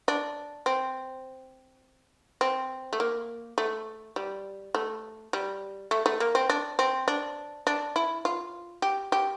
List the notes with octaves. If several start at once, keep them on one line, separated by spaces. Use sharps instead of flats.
D4
C4
C4
A3
A#3
A3
G3
A3
G3
A3
A3
A#3
C4
D4
C4
D4
D4
E4
F4
G4
G4